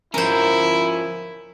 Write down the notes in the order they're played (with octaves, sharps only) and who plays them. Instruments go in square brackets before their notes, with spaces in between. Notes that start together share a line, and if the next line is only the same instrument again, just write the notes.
[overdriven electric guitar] F3 C#4 [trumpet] E4 [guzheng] A#4 C5